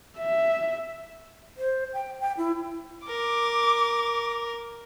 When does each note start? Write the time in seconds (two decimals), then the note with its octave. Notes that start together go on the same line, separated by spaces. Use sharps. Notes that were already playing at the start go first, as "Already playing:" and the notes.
0.18 E5
1.58 C5
1.94 G5
2.21 G5
2.38 E4
3.07 A#4 D6